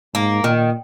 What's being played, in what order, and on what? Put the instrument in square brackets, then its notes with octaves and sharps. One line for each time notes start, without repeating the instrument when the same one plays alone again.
[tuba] G#2 [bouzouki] A#3
[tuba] A#2 [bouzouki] D#3